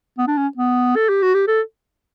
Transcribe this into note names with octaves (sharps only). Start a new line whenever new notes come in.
B3
D4
C#4
B3
A4
G4
F#4
G4
A4